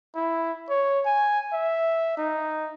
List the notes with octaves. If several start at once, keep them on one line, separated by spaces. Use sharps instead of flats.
E4
C#5
G#5
E5
D#4